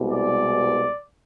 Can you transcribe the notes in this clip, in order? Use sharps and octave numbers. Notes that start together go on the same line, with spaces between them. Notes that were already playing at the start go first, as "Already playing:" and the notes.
Already playing: C2 B2 G#3
D5